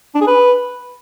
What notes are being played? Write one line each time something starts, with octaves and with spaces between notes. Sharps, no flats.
D4
G#4
B4